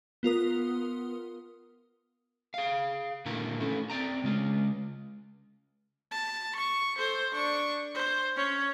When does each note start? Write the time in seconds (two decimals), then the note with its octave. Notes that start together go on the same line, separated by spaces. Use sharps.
0.23 B3 F4 A#4 D#6
2.54 G#4 F5
3.25 A#2 D3 D#3 A#3 E4 A#5
3.60 A3 C#4 E4 A4
3.90 C4 D5 G5 A#5
4.24 C#3 G#3 F4
6.11 A5
6.56 C#6
6.97 A4 C5
7.34 D4 C#6
7.95 C5
8.37 C#4 C#5